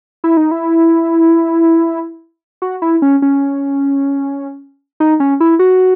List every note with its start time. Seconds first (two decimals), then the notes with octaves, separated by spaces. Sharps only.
0.24 E4
0.37 D#4
0.51 E4
2.62 F#4
2.82 E4
3.02 C#4
3.22 C#4
5.00 D#4
5.20 C#4
5.40 E4
5.59 F#4